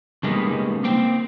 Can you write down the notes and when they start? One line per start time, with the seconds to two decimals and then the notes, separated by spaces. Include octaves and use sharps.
0.23 C#3 G3 G#3 A#3 B3 D#4
0.83 A#3 C4 G5